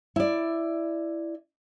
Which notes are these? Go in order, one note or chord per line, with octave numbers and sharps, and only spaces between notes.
E4 D5